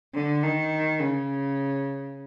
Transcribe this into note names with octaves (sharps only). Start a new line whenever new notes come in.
D3
D#3
C#3